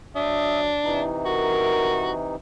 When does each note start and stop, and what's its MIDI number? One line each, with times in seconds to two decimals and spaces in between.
0.16 0.75 54
0.16 1.02 62
0.16 0.60 76
0.16 0.60 87
0.84 2.36 48
0.84 2.36 52
0.84 2.36 63
0.84 1.19 64
1.25 2.11 66
1.25 2.02 70